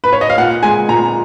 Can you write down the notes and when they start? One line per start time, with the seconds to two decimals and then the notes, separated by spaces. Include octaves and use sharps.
0.04 B4
0.13 C#5
0.21 D#5
0.30 F5
0.38 A#2 F#5
0.63 G#3 G#5
0.89 A#2 A#5